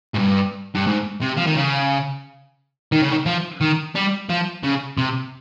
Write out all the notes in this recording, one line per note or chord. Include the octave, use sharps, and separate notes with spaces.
G#2
G2
G2
G#2
C3
F3
D#3
C#3
D#3
C#3
D#3
F3
D#3
G3
F3
C#3
C3